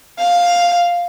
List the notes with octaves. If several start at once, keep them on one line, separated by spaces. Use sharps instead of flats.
F5